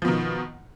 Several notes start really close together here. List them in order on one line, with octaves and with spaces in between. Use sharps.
F3 B2 D#3